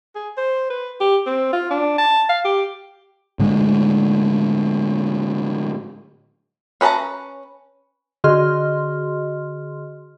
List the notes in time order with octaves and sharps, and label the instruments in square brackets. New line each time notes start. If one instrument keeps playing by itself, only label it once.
[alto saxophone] G#4
C5
B4
G4
C4
F4
D4
A5
F5
G4
[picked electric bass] A2 D3 G#3
[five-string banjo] C#4 B4 D#5 A5 A#5
[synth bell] D3 F#4 G#4 D#5 C6 F6